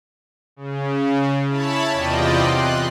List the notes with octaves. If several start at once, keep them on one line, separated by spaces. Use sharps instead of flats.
C#3
E4 C#5 A5 B5
E2 C3 F4 D5 D#5 G5
C6 F#6